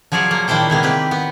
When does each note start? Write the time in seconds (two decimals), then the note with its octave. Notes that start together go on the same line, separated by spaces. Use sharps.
0.12 F3 F#3 G#4 D5 F5 F#5
0.31 A#3
0.48 A#2 D#3 D4 E4 C5 G5
0.70 C3 G#3 A#3 B3
0.83 C4 G4 B4
1.11 B3